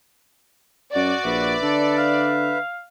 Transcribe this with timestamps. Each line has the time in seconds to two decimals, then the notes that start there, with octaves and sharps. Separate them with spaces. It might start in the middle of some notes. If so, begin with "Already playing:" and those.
0.95 F#2 F#4 D5
1.25 A#1 B4 E5
1.62 D3 A4
1.97 F5